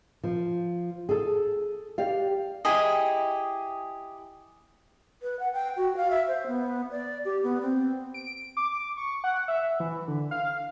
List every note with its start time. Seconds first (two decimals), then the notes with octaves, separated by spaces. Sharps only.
0.24 F3
1.09 G#4 A4
1.98 G4 D5 F5
2.65 E4 G4 G#4 D#5
5.23 B4
5.39 F#5
5.53 G5
5.77 F#4
5.97 F5
6.11 E5
6.28 C5
6.47 B3
6.91 D5
7.25 G4
7.43 B3
7.62 C4
8.14 D7
8.57 D6
8.97 C#6
9.24 F#5
9.48 E5
9.80 E3
10.08 D3
10.31 F5